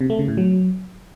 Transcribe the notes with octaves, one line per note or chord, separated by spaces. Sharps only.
C3
A3
C#3
A2
F#3